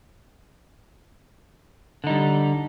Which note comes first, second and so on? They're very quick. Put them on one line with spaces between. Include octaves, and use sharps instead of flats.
D3 D#4 G3